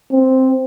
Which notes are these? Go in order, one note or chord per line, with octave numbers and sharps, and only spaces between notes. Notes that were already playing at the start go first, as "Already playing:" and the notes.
C4